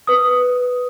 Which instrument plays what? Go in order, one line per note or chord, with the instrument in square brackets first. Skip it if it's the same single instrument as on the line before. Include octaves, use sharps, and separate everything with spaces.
[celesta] B4 D#6